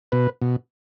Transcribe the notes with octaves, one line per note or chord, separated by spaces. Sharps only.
B2 B4
B2